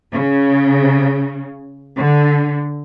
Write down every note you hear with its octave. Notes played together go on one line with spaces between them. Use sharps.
C#3
D3